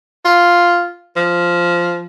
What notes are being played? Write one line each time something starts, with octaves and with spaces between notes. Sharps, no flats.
F4
F3